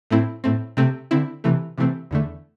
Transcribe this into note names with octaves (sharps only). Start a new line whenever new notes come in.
A2 A3 C4 E4
A2 A3 C4
C3 A3 C4
D3 C4 E4
C3 E3 A3
C3 E3 A3 C4
E2 D3 A3